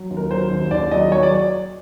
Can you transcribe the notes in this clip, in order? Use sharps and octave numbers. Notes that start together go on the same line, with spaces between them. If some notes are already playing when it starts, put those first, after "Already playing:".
Already playing: F#3
D#2
A#4
F#3 C5
D#2
D#2 D5
F#3 D#5
F#3 C#5
D5